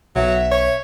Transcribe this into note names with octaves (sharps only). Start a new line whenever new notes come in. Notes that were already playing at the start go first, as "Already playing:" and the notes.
B1 F#3 E5
C#5